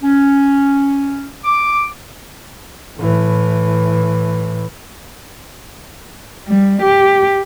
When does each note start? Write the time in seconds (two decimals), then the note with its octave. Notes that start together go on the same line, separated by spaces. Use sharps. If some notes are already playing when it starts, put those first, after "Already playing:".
0.02 C#4
1.44 D6
2.99 A2 E3
6.48 G3
6.82 G4